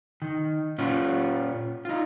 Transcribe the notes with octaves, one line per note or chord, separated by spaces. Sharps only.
D#3
A#2 C#4 F4
D#4 F4